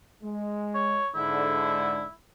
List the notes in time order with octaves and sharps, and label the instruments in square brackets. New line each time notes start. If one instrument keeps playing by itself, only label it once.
[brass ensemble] G#3
[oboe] C#5
[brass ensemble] G#2 D3 [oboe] E4